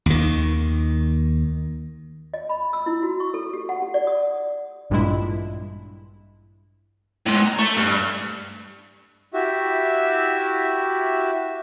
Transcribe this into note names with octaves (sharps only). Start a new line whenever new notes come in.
D#2 D#3
D#5
B5
E6
E4
F#4
C#6
A4
G4
F#5
G4
D5
D#6
A1 G2 A#2 G#3 E4
A2 G#3
A#5
A3
G2
E4 F#4 G4 E5